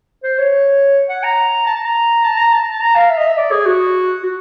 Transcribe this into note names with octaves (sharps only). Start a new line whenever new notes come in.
C5
C#5
F#5
A#5
A5
A5
A#5
A5
A#5
A5
A5
A#5
F5
E5
D#5
E5
D5
G#4
F#4
F#4